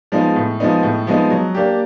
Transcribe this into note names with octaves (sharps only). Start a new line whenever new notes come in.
F3 G#3 B3 D#4
A2
F3 G#3 B3 D#4
A2
F3 G#3 B3 D#4
F#3
A#3 D4 G4